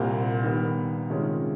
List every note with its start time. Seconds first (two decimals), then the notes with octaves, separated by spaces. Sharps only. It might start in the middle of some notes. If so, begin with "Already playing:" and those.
Already playing: C2 A#2 G3 C4
0.43 D#3 G3 B3
1.10 C3 D#3 G#3 C#4 F4